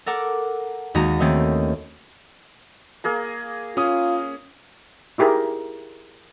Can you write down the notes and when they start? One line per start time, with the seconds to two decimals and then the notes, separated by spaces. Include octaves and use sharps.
0.06 A4 A#4 F#5 D6
0.94 D#2 D#3 G#3 F#4 A#5
1.20 D#3 A3 C4 C#4
3.04 A#3 G#4 A#5
3.77 C#4 F4 D#6
5.18 D#4 E4 G4 G#4 A#4 A#5